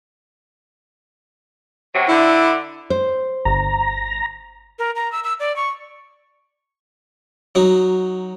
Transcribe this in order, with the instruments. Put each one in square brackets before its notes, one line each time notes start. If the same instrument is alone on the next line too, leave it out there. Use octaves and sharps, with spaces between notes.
[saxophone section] F#2 C3 F#3
[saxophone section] D3 [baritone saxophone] E4
[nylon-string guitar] C5
[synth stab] G1 [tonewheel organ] A#5
[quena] A#4
A#5
E6
E6
D5
C#6
[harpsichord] F#3 D#4 F#4